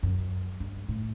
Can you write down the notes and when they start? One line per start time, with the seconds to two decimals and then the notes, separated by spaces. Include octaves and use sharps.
0.03 F#2
0.60 G2
0.88 A2